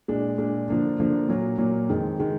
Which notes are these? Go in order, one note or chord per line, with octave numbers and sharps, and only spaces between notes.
A#2 G#3 D4
A#2 G#3 D4
D3 F3 A#3 D4
D3 F3 A#3 D4
A#2 F#3 A#3
A#2 F#3 A#3
F2 D#3 G#3
D#3 G#3